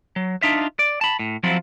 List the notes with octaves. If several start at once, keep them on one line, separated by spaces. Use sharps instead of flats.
F#3
D4 D#4 F4 E5
D5
A5 B5
A2
F3 F#3 C4 E4 F4